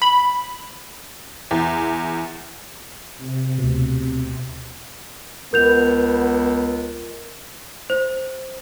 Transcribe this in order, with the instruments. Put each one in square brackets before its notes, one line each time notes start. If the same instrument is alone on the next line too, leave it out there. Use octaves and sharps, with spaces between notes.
[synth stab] B5
[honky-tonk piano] E2
[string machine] C3
[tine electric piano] D2 B2
[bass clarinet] C#2 [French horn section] B3 [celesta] A#4 G6 F7
[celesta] C5